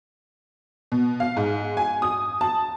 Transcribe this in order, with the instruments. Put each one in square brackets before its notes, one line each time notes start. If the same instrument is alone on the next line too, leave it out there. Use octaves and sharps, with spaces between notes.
[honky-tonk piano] B2
F5
G#2
G#5
D#6
A5